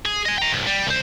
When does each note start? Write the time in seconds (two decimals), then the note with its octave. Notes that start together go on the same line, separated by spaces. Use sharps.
0.06 G#4
0.26 D#5 G#5
0.38 G5 A#5
0.53 C2 G2
0.67 G3
0.87 C2 C5